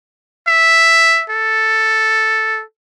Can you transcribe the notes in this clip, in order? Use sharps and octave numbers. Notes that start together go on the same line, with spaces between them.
E5
A4